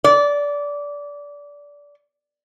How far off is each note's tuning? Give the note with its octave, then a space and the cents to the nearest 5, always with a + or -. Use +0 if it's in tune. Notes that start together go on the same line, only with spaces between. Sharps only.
D5 -20